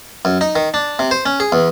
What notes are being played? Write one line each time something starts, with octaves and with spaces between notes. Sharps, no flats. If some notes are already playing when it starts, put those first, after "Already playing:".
F#2
D#4
D#3
D4
C3
C5
C#4
G#4
E2